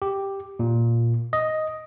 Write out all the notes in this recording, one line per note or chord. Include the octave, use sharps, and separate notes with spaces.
G4
A#2
D#5